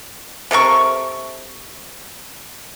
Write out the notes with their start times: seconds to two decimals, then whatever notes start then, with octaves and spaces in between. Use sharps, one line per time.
0.51 C3 A4 A#4 C#6